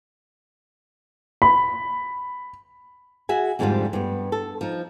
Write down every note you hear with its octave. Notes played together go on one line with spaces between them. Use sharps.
B5
F#4 G#4 E5 G#5
F2 G#2 D3 G3 A3 F4
G2 B3
A4
F3 D#4